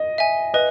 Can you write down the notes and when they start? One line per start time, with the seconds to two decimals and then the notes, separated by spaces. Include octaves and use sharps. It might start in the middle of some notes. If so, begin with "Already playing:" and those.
Already playing: D#5
0.18 E5 G#5
0.54 B4 D#5